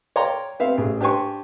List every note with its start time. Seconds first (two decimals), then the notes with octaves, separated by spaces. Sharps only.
0.16 C#5 D5 F5 G5 A#5 C6
0.60 B3 C4 E5 F5
0.77 A1 G#4
1.01 D4 G4 C5 G#5 C#6